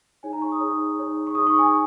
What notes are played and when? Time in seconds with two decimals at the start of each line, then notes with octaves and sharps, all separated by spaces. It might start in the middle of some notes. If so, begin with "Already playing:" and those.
0.23 D#4 G#4 C#5 G#5
0.33 A#5
0.42 C#6
0.52 D#6
0.61 D#4 G#4 C#5
0.98 D#4 G#4 C#5
1.27 C#6
1.35 D#4 G#4 C#5 D#6
1.47 C#6
1.59 G#5